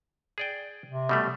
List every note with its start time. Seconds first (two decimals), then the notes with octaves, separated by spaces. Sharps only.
0.38 G#4 D5 G5
0.88 C3
1.09 B2 G3 A3